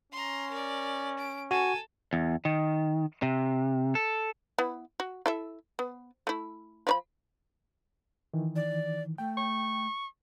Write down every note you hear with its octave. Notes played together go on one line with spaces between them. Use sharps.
C#4 A#5 C6
A#4 D5
D7
F#4 A4 G#5
E2
D#3
C3
A4
B3 E4
F#4
E4 A4 E5
B3
A3 E4
F3 C#5 B5
D#3 E3
D5
A3 G5
C#6